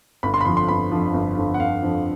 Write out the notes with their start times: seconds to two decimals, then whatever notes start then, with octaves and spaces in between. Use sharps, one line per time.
0.23 G1 B5
0.34 C6
0.41 B5
0.45 F2 D3 F3 C6
0.57 C6
0.68 G1 B5
0.92 F2 D3 F3
1.14 G1
1.37 F2 D3 F3
1.54 F#5
1.60 G1 F5
1.82 F2 D3 F3